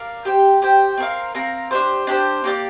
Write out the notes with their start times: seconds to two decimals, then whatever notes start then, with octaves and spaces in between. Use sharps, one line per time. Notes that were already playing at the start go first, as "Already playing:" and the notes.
Already playing: A#4 D5 F5
0.25 G4 C5 G5
0.62 G4 C5 G5
0.97 C4 A#4 F5
1.35 C4 A#4 F5
1.71 D4 G4 C5
2.07 D4 G4 C5
2.44 A#3 G4 D5